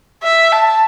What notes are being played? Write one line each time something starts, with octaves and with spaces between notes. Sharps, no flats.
E5
A5